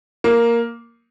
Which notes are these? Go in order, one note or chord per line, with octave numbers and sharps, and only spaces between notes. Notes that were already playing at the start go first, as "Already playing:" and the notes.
A#3